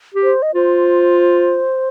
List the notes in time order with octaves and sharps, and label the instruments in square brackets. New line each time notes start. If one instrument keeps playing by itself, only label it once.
[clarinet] G4
[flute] C5
D#5
[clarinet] F4 [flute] C5